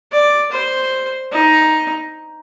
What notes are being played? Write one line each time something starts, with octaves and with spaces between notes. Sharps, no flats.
D5
C5
D#4